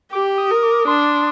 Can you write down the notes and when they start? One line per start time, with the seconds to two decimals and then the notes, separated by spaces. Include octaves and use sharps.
0.13 G4 D6
0.38 D#6
0.51 A#4
0.63 D6
0.87 D4 C6